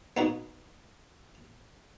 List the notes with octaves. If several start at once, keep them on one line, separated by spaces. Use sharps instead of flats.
B3 D#4 F#4